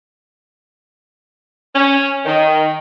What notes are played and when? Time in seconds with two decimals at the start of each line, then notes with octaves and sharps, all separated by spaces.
1.75 C#4
2.26 D#3